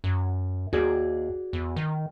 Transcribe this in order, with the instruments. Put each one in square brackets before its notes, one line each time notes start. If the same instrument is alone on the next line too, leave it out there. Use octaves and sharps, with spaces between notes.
[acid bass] F#2
[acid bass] D#2 [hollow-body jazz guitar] F#4 G#4 D5
[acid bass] E2
D#3